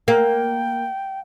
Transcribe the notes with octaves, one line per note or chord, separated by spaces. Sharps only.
A#3 G5